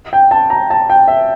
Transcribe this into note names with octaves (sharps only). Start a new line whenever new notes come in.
G5
A5
A#5
A5
G5
E5